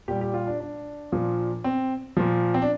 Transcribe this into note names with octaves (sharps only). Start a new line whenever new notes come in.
A#2 G3 G4
G4
F4
D4
D4
A#2 F3
C4
A#2 F3
C4
D4